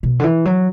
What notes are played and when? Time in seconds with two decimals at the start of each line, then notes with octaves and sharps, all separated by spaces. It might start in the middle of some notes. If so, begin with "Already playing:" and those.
0.03 B2
0.20 D3
0.24 E3
0.45 F#3